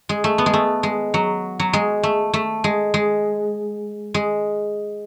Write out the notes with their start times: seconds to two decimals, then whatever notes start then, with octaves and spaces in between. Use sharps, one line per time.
0.09 G#3
0.24 A3
0.38 B3
0.46 G#3
0.53 A3
0.83 G#3
1.14 F#3
1.60 F#3
1.73 G#3
2.03 A3
2.34 A3
2.64 G#3
2.94 G#3
4.14 G#3